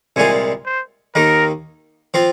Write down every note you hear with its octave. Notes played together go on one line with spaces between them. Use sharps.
C2 A#2 G#3 F4 G#5
C5
D#2 D#3 A#3 A#4
F3 C4 F4